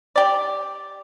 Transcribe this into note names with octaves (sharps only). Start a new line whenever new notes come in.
G4 D5